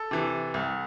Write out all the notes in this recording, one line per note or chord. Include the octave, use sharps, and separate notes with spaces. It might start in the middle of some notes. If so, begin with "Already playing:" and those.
Already playing: A4
C3 E3
C2